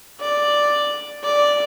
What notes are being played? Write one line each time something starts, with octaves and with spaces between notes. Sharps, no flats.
D5
D5